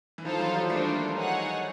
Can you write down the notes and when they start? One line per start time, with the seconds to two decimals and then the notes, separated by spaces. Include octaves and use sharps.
0.18 E3
0.25 D#3 F3 F4 A4 C5 F5 A5
0.39 E3 F#3
0.55 F3 G3
0.69 G3 A3 A#3 D4 F4 A4 C5
1.14 D#4 G#4 C#5 F#5